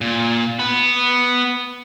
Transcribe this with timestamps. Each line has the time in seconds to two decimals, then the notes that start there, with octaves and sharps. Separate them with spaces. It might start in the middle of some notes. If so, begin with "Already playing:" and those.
0.01 A#2
0.59 B3 B4